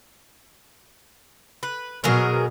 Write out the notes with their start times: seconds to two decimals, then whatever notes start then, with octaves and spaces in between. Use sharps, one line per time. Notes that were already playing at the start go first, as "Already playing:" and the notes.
1.63 B4
2.04 B2 F#3 G#4 A#4